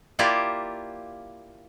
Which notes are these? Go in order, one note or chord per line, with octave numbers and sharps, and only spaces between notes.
A#3 E4 F4 G4 D5